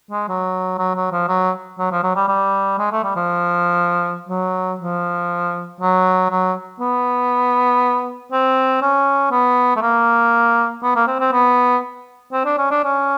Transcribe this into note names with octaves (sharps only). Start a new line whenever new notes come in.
G#3
F#3
F#3
F#3
F3
F#3
F#3
F3
F#3
G3
G3
G#3
A3
G3
F3
F#3
F3
F#3
F#3
B3
C4
C#4
B3
A3
A#3
B3
A#3
C4
C4
B3
C4
D4
C#4
D4
C#4